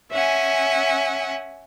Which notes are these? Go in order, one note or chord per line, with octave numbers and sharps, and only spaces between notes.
C#4 E5 F#5 G#5